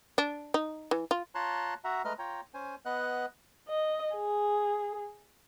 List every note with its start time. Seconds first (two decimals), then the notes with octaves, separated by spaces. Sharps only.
0.18 D4
0.54 D#4
0.91 E3
1.11 F4
1.35 F4 C#5 A5 A#5 C6 F#6
1.84 F#4 E5 F#5 A#5
2.05 G#3 A3 B4 D#5 A#5 F6
2.19 F4 C#5 G5 A#5
2.54 C#4 C5 G#5
2.85 B3 B4 D#5 F#5 F#6
3.69 D#5
4.16 G#4